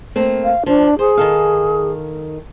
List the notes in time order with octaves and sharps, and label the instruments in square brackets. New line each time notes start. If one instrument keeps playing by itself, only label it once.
[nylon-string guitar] A3 A#3 C4
[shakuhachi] F5
[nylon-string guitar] F3 [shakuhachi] D4
[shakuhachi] G#4 [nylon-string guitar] C5
[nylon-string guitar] D#3 A4 F5